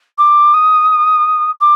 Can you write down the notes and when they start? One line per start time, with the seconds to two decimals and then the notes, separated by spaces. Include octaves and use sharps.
0.18 D6
0.54 D#6
1.61 D6